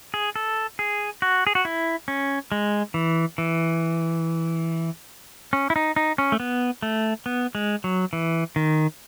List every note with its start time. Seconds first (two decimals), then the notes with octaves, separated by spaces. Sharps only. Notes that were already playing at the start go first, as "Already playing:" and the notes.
0.14 G#4
0.36 A4
0.79 G#4
1.22 F#4
1.47 G#4
1.55 F#4
1.65 E4
2.08 C#4
2.52 G#3
2.94 E3
3.38 E3
5.53 C#4
5.70 E4
5.76 D#4
5.96 D#4
6.18 C#4
6.32 A3
6.40 B3
6.82 A3
7.26 B3
7.55 G#3
7.84 F#3
8.13 E3
8.56 D#3